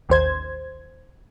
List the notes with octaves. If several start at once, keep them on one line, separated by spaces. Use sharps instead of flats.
A1 D#2 C5 G#6